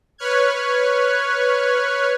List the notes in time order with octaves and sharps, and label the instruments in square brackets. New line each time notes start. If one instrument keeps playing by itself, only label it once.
[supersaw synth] B4 C#5 F6 F#6 G#6